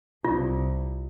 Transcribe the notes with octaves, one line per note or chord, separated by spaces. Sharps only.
C2 F4